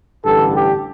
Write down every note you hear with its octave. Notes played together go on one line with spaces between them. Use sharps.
A1 G2 D3 A4
G4